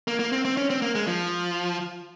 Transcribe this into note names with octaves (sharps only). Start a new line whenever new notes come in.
A#3
A#3
C4
C4
C#4
C4
A#3
G#3
F3